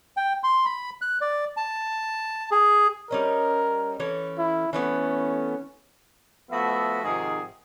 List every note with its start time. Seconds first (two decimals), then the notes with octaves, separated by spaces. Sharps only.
0.17 G5
0.43 C6
0.65 B5
1.02 F#6
1.21 D5
1.57 A5
2.51 G#4
3.11 G3 C#4 A#4 D#5
4.00 E3 C#4 A4
4.38 E4
4.73 E3 A3 B3 C#4
6.51 F3 A3 B3 F#4 E5
7.04 G#2 C3 D#3 F3 G#4